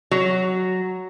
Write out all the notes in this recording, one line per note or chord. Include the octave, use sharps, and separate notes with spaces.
F#3